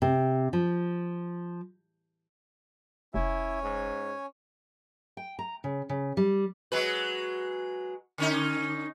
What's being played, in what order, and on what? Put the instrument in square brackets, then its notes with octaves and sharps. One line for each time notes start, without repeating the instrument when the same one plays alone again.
[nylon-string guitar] C3
F3
[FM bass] F1 [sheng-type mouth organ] C#4 C#5 G#5 [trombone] E4
[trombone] G#2
[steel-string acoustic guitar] G5
A#5
C#3
C#3
G3
[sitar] F#3 G#3 B4
D3 C#4 D#4